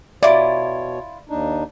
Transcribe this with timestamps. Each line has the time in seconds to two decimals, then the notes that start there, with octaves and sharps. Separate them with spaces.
0.23 B2 E4 F4 C#5 D5
1.29 D#2 D4 D#4